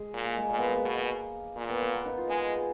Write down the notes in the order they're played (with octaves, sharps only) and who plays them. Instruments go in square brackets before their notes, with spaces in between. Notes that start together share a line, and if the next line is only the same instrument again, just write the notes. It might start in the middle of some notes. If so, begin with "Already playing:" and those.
Already playing: [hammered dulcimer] G#3
[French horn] A#2
[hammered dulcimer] A#3
G#3
[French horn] A#2 [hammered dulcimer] A#3
[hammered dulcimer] B3
G#3
A#3
[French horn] B2
A#2
[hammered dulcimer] B3
A#3
B3
D#4
F4
[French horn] G#3 [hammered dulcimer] G#4